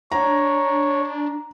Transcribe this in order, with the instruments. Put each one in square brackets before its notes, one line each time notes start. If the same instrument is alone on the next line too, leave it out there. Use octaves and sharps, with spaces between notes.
[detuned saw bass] D4 [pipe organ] C#5 [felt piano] A#5